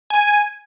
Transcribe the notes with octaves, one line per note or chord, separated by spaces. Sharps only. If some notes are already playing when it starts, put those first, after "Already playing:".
G#5